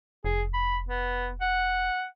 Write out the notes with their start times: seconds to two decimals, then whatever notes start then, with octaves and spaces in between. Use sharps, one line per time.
0.25 F1 G#4
0.54 B5
0.88 B3
1.41 F#5